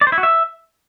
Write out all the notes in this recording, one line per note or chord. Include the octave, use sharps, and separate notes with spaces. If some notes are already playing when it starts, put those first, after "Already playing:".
D5
C5
E4
F#4
E5